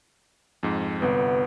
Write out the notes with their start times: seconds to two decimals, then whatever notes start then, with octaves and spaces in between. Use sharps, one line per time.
0.63 F2 G#2
1.02 G1 C2 B3